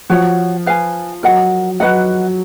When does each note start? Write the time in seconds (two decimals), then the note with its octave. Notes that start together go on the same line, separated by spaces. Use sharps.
0.10 F3 F#4 C#5 F#5
0.66 B4 F5 G#5
1.23 F#3 A#4 D#5 F#5
1.80 F#3 F#4 B4 D#5 F#5